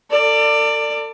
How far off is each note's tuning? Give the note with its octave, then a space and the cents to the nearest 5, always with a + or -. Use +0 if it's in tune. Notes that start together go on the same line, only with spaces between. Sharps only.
A4 +40 D5 +10